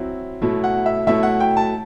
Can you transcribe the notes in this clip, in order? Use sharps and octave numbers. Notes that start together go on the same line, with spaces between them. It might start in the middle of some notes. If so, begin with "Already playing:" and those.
Already playing: F#3 C4 E4
B2 F#3 A3 E4
F#5
E5
B2 F#3 A3 E4 E5
F#5
G5
A5